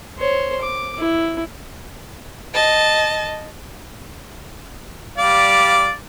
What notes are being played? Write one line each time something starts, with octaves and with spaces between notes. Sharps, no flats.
C5 C#5
D6
E4
D#5 A5
G3 D5 F5